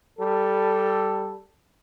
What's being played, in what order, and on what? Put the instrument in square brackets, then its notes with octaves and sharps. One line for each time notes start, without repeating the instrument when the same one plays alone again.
[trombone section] G3 A4